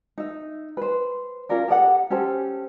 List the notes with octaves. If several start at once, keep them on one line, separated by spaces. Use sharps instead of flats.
D#4 E5
B4 C5
C#4 F4 A#4 D5
G4 A4 D5 F#5
C#4 G4 A4 C5